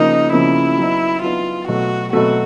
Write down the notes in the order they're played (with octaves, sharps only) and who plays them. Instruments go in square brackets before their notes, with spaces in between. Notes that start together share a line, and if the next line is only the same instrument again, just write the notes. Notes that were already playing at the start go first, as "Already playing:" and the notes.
Already playing: [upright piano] C#3 F3 A#3 [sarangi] D#4
[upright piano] C#3 F3 A#3 [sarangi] E4
[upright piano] F#3 B3 D#4
[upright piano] F#3 B3 D#4 [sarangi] F4
[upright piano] B2 F#3 A3 [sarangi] F#4
[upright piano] B2 F#3 A3 [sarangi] F#4